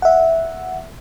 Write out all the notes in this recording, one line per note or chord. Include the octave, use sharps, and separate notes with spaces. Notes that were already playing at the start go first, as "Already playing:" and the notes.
E5 F#5